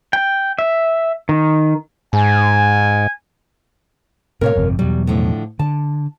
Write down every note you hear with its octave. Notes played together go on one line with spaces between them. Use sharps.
G5
E5
D#3
G#2 G#5
A2 C3 A#4 C#5 F5
G1 F2 C3
E2 B2 F#3 G3
A2 D3 F3
D3 A5